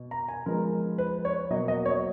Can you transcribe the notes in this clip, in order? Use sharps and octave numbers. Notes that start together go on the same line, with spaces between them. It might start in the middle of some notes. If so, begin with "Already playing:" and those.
Already playing: B2
A#5
G#5
F3 G#3 B3 A#4
B4
C#5
B2 F#3 A#3 D#5
D#5
C#5